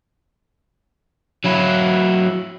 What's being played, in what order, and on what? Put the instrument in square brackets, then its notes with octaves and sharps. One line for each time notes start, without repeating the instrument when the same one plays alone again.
[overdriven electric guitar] F#3 E4